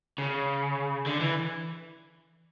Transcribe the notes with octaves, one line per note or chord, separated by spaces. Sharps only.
C#3
D3
E3